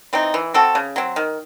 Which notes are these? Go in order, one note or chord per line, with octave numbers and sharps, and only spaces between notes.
E3 C4 D#4
E3
C4 F#4 A4
C#3
F#3 C4
D#3